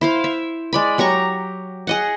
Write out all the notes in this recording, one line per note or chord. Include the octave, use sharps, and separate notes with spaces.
E4 C5 F5
E5
G#3 D5 B5
F#3 G4 A#5 C#6
G#4 D#5 F#5